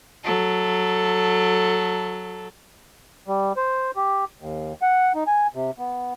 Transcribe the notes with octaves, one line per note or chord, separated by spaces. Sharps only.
F#3 A4
G3
C5
G4
D#2
F#5
D#4
G#5
C3
B3